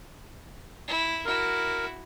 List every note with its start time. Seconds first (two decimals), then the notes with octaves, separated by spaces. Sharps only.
0.88 E4
1.25 E4 F#4 A#4